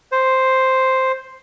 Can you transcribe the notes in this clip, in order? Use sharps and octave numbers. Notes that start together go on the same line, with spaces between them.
C5